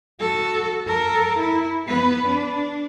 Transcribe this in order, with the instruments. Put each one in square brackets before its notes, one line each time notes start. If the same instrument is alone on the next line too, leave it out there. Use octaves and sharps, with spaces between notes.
[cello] F#4 A4
A4 A#4
E4
B3 B4
D4